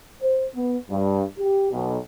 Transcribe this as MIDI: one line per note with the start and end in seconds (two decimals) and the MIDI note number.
0.22 0.44 72
0.56 0.78 59
0.90 1.23 43
1.39 1.70 67
1.72 1.96 35